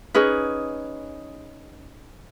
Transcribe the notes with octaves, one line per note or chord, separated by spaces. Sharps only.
C#4 D#4 G#4 B4